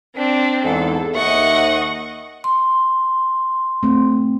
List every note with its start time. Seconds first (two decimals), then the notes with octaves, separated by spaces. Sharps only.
0.16 C4 D4
0.65 E2 G#2 A4
1.15 D#2 D#5 E5 F#5 C#6
2.44 C6
3.83 A3 C4